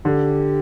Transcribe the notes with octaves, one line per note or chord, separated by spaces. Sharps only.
D3 G4